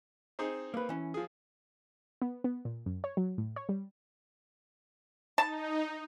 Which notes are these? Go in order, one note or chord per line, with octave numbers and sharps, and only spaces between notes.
C4 D#4 G#4
A#3 B4
E3 C#4
F3 G#4
B3
B3
A#2
F#2
C#5
F#3
A2
C#5
G3
D#4 A5